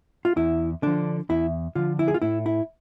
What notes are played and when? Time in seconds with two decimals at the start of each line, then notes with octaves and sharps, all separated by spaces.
0.25 F4
0.36 E2 E4
0.82 D3 F3 D4
1.29 E2 E4
1.75 D3 F3 F4
1.99 E4
2.08 G#4
2.14 F4
2.22 A2 E4
2.46 E4